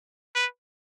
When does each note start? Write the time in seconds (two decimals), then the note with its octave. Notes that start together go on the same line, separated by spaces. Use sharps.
0.35 B4